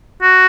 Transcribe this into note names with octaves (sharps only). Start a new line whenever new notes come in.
F#4